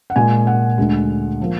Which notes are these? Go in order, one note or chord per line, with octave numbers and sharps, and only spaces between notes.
F#5
A#2 G#3 G#5
F#5
D2 D3 G#3
F3 A#3